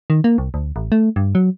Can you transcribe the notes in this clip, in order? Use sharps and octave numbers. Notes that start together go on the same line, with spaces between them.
D#3
A#3
C2
D2
A1
A3
G2
F#3